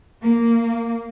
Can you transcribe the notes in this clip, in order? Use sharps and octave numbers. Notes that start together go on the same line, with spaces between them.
A#3